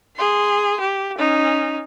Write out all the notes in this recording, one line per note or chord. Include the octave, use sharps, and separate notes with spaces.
G#4 C6
G4
C#4 D#4